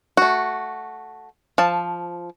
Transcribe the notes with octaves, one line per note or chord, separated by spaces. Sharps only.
A3 F#4
F3 A5